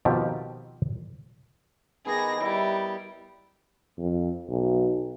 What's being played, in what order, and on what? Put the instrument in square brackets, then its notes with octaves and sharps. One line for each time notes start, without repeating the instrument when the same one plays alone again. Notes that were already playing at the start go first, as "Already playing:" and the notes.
[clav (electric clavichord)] B2 D#3 F3 C4 G4
[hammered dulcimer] D#3 B3 G4 [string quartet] G#4 A#6
[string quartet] G3 [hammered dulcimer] E4
[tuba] F2
B1